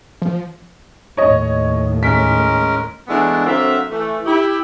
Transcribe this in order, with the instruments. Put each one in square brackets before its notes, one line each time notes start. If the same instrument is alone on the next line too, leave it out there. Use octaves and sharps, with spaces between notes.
[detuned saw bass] F3
[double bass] D#2 A2 [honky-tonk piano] C#5 D#5
[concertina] G#3 C#4 A#4 [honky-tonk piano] B6
[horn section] E3 G#3 A3 B3 D4
D3 F#3 A#3 C4 E5 F5
E3 A3
E4 G4